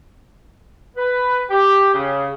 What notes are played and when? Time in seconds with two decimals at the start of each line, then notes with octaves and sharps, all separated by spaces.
0.97 B4
1.50 G4
1.94 C#3